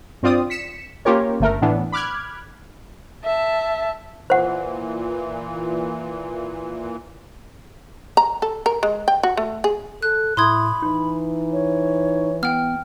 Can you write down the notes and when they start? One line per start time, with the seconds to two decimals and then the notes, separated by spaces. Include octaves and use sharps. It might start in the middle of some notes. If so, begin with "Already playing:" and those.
0.23 G2 C4 F4 D5 D#6
0.50 B6 C#7 E7
1.05 A#3 C#4 F4 G4 A#4 C#5
1.40 G1 A3 A#4
1.62 A2 E3 B3 D4
1.92 B5 D6 F6 F#6 G#6
3.24 E5 A5
4.30 A#2 E3 C5 F#5
8.17 A#5
8.42 A4
8.66 A#4
8.83 G#3
9.08 G5
9.23 F#4
9.37 A3
9.64 G#4
10.02 A4 F#6
10.37 A2 E4 B5 C6 D#6 G#6
10.82 E3 D#4
11.52 C#5
12.43 B3 G5 F6